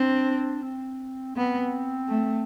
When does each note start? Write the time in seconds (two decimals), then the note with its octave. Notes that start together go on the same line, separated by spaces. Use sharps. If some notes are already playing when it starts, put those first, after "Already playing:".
Already playing: C4 D4
0.63 C4
1.36 B3 C4
2.08 A3